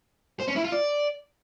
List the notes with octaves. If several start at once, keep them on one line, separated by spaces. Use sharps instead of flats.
C5
C#4
E4
F4
D5